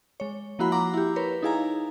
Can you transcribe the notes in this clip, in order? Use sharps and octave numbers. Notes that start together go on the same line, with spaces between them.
G#3 C#5
F3 A#3 E4 F#4 F#5 B5
F#5 A#5 C6 D6
E4 G4
A#4 B4 C#5
D#4 E4 G#4 F5 G#5 A#5